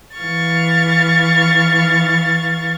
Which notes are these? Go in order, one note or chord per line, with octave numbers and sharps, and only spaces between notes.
E3 F5 C#6 A6